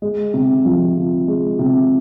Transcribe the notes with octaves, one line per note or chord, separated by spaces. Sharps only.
G#3
C3
F3
C3
G#3
C3